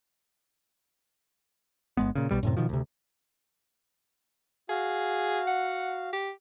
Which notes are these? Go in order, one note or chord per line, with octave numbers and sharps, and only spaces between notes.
G1 G#3 B3
A#2 C#3
B1 B2 G3
F#2 A2 C3
B2 D#3 F3
D2 C3
F#4 G#4 F5
F#5
G4